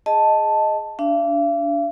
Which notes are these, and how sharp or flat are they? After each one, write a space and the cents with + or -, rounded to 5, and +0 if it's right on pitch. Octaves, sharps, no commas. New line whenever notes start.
G#4 -5 D#5 +0 A5 +0
D4 -20 F5 -45